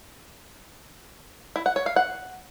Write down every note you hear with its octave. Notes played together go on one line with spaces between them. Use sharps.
E4
F#5
C#5
F5
F#5